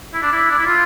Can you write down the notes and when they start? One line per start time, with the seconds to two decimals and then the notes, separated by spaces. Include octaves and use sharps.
0.14 E4
0.23 D4
0.32 E4
0.51 D4
0.59 E4
0.66 F4